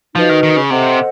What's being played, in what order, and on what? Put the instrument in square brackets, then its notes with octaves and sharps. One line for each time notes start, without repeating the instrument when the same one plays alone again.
[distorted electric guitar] F3 [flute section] D#4 F#4 B4 D#5
[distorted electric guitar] D#3
D#3
C#3
[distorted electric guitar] C3 [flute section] A4 C5 D#5 F#5